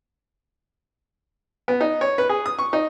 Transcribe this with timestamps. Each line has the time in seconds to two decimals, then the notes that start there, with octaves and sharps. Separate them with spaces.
1.68 B3
1.81 D#4
2.01 C#5
2.18 B4
2.29 G#4
2.46 D#6
2.59 C#6
2.73 D#4